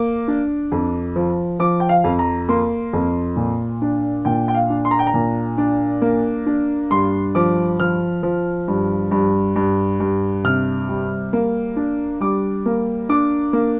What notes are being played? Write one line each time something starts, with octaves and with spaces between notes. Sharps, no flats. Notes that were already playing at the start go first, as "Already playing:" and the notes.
Already playing: A#3 D6
D4
F2
F3
F3 D6
G5
F5
F2
A#5
A#3 C6
F2
A#2
D4
A#2 G5
G5
F5
D4
C6
A#5
G5
A#5
A#2
D4
A#3
D4
G2 C6
F3 D6
F3 F6
F3
G2
G2
G2
G2
C3 F6
G3
A#3
D4
G3 D6
A#3
D4 D6
A#3